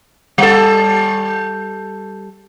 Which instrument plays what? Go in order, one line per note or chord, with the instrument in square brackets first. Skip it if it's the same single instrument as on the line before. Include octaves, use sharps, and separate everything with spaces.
[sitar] G3 A4